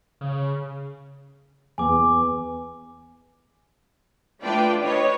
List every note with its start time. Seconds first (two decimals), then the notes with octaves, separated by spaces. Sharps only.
0.21 C#3
1.78 E2 B3 G#5 D6
4.42 A3 D4 F4 B4 D5 G5
4.83 D4 B4 C#5 D#5